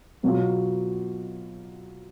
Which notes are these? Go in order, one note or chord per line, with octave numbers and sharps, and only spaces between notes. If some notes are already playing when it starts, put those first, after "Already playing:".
B2 F#3 B3 F4